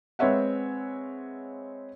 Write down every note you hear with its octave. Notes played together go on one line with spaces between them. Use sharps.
G#3 C4 B4 C#5 E5 F#5